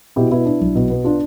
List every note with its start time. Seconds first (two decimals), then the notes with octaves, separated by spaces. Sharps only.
0.16 B2 E4 G4
0.31 B3 E4
0.45 D4
0.61 B1
0.75 B2
0.90 B3
1.04 D4 F4